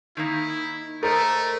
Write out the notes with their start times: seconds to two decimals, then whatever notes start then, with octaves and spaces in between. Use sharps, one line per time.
0.17 D#3 A#3 D#4 E4
1.03 A3 A4 A#4 C5 D#5